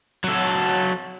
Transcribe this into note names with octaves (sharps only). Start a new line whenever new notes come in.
F#3 A4